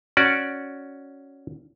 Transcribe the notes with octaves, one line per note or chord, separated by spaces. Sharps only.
C#4 F#4 D5